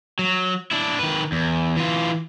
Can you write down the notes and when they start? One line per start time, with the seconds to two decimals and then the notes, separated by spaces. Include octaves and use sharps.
0.19 F#3
0.71 D4 E4
0.99 D#3 B4
1.32 E2
1.77 E3 F4